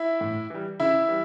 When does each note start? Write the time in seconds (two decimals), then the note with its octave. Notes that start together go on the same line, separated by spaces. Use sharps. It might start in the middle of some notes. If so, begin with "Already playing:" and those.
Already playing: E4 E5
0.21 A2
0.50 E3 G3
0.80 C#3 E4 E5
1.09 E3 G3